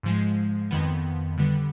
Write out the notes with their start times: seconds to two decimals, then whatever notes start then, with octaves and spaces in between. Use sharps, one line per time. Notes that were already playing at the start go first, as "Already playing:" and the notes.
0.03 G#2 F3 G#3
0.71 F2 D#3 B3
1.38 D3 G3 B3